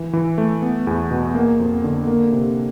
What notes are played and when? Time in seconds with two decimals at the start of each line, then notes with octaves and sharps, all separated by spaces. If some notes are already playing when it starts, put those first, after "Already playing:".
Already playing: E3
0.13 E3
0.38 A3
0.62 B3
0.87 E2
1.11 B2
1.34 A#3
1.60 F2
1.84 D3
2.07 A#3
2.32 C3